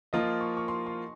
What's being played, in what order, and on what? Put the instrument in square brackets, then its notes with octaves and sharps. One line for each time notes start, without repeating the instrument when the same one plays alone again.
[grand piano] F3 A#3 F4 [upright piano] D#5
[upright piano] C#6
C#6
C6
C6